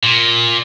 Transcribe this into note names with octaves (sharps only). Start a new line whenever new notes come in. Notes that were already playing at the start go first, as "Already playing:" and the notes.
A#2